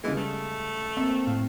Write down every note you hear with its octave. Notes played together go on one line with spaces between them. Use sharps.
C#3 E3 G3 G#3
A3
A#3 C4 E5
A2 F5